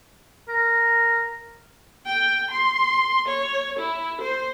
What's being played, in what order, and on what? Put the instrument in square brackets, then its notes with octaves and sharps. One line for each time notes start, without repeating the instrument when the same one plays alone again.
[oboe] A#4
[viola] G5
C6
C#5
E4
C5